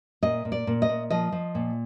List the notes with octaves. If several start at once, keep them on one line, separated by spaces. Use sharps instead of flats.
A#2 D#5
A#2
D5
A#2
D#5
A#2
F3 D#5
F3
A#2